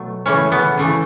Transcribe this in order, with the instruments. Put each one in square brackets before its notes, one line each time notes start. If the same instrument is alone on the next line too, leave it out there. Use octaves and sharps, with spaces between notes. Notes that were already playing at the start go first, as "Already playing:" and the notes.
Already playing: [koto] B2 F#3 A3
C#3 E3 A3 C#4
B3
C#3 E3 A3